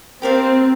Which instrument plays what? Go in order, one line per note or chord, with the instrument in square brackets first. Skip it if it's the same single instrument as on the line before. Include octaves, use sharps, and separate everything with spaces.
[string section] C4 [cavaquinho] G4 A#4 D5 F5